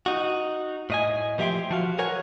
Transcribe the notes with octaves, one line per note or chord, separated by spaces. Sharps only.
D#4 F#4
A2 D#5 G#5
A#2 F3 G4 E5 G5 C6
F3 F#4 F5
G#4 A#4 C#5 F#5 G#5